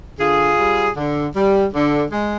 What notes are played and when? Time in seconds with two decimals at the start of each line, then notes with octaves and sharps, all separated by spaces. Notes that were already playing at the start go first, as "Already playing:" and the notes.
0.19 D3 F4 G#4
0.58 G3
0.96 D3
1.35 G3
1.73 D3
2.11 G#3